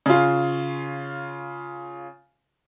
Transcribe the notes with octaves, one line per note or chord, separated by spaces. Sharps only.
C#3 F4